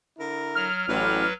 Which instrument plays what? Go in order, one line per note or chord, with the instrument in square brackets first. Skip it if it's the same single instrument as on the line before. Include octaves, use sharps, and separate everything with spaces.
[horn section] D3 E4 A#4
[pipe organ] F#3 [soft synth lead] F6
[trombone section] A1 [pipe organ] F#3 B4 [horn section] E4 F#4 D5